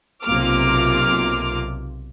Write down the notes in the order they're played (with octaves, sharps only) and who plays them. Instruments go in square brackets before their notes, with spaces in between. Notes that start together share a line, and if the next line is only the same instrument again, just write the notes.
[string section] B1 C3 A#3 F4 D6 F6